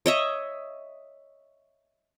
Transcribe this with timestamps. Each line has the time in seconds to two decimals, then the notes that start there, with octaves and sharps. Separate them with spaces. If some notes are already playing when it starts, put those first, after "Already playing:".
0.06 C#5 D#5 E5